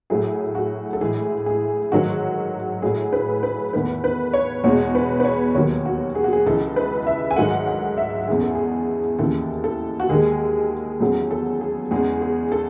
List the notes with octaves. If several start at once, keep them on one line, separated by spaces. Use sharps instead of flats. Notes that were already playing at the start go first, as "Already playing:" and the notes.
A2 F#3 A3 G#4
F#4
A4
A2 E3 G#3 G#4
G#4
G#2 D#3 F#3 A3 F#4
A2 F#3 A3 G#4
B4
B4
E2 D#3 A3 B4
B4
C#5
E2 B2 G#3 C#5
B4
B4
C#5
D#2 D#3 F#3 C#5
F#4
G#4
F#4
G#4
C#2 C#3 E3 G#3 A4
B4
E5
G#5
G#2 D#3 F#3 A3 F#5
F#5
E5
E2 C#3 E3 G#3 G#4
A4
G#4
D#2 C#3 E3 A4
A4
F#4
D#2 D#3 G#3 G#4
E2 C#3 F#3 A3 G#4
A4
G#4
E2 C#3 G#3 G#4
G#4
A4